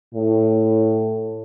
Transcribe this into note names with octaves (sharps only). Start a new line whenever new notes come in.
A2